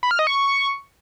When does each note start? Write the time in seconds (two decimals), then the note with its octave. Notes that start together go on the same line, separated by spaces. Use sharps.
0.03 B5
0.11 F6
0.19 D#5
0.27 C#6